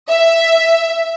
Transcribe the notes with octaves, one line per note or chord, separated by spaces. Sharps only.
E5